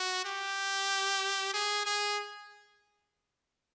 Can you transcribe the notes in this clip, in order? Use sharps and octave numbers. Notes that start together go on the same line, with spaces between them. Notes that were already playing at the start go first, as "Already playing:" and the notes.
Already playing: F#4
G4
G#4
G#4